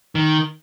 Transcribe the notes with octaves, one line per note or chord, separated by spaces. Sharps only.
D#3